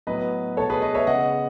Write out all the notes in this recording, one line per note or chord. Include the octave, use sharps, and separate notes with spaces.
A2 F#3 B3 B4 D#5
B2 A3 A4 C#5
G#4 B4
B4 D#5
C#5 E5
C#3 G#3 B3 D#5 F#5